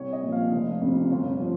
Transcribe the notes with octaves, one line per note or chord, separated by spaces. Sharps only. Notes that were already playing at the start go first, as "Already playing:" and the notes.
Already playing: C2 C#5
D#5
A#2 F3
F5
F1
F2 C3
G1
F3